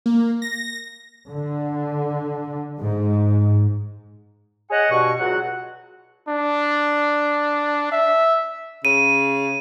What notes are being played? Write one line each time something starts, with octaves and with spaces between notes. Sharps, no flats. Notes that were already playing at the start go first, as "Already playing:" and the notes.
A#3
A#6
D3
G#2
G#4 C#5 D#5 F#5
G2 B2 C#6
C#2 F#3 F#4 F#5
D4
E5
C#3 D#7